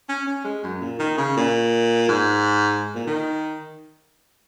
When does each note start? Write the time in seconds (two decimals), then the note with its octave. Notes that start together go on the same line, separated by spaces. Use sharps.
0.09 C#4
0.27 C#4
0.44 G#3
0.63 F#2
0.81 A#2
0.99 D#3
1.17 C#3
1.37 A#2
2.09 G#2
2.95 A#2
3.07 D#3